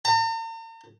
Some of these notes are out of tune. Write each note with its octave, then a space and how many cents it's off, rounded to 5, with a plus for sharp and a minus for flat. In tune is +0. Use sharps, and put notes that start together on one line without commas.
A#5 -45